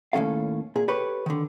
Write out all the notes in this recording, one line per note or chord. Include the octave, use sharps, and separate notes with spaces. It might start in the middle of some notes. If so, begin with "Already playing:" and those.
D#2 A2 C#3 C#4 A4 F5
A#2 G#4
G4 A4 B4 C#5
D3 D#3